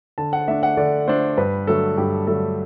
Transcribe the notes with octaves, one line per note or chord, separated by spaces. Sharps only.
D3 A5
F#5
A3 D4 E5
F#5
D3 D5
A3 D4 C5
G2 B4
D3 F#3 A3 A4
G2 G4
D3 F#3 A3 A4